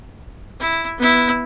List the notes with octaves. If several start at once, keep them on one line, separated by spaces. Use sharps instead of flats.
E4
B3 E4